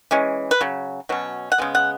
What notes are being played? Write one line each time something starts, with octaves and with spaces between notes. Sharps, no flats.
E3 G#3 C#4
B4
C#3 F#3
B2 F#3 C#4
F#5
C#3 G#3 B3
F#5